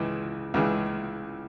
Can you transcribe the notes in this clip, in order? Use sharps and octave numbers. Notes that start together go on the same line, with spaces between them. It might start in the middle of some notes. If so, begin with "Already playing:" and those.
Already playing: C#2 C#3 E3
C#2 C#3 E3